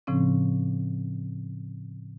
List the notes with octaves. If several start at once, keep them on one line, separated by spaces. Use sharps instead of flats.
A2 C#3 F3 C4 C#4